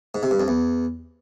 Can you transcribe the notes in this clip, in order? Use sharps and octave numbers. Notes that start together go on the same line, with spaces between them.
G#2
C3
G2
F2
E2